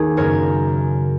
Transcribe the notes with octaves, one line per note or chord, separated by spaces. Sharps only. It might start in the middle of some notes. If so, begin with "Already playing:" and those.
Already playing: D#2 D#3 G#4
F#2 C#3 A#4 C#5